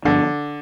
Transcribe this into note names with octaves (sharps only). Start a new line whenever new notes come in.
G2 D3 F3 B3 D4